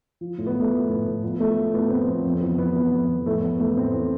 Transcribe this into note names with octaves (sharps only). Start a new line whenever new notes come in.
F3
A2
B3
F3 A3
A2
A2
A2
F3 B3
F3 A3
F3
A2 B3
F3 C4
F3 B3
F2 C4
E3 B3
E3 B3
E3 B3
F2
F2
A2 A3
A2 B3
E3 A3
A2 C4
E3